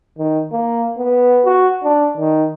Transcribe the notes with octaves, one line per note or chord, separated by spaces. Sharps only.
D#3
A#3
B3
F#4
D4
D#3